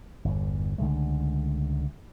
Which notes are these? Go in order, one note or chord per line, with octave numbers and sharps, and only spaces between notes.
G1 E2
C#2 D3 G#3 A3